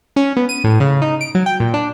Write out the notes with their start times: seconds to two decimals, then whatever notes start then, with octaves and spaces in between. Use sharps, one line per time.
0.16 C#4
0.37 B3
0.49 D#7
0.64 A2
0.80 C#3
1.02 D#4
1.21 D7
1.35 F#3
1.46 G5
1.60 A#2
1.74 D4